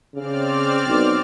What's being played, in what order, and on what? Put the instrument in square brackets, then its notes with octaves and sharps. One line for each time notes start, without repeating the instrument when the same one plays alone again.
[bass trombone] C#3 [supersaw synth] C4 D5 F6
[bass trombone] B1